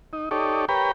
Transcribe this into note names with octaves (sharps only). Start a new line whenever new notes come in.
D#4
D#4 G4 A4 C#5 D5
G4 A#4 B4 C#5 G5 B5